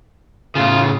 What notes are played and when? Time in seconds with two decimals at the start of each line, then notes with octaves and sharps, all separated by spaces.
0.55 A2 C#3 F4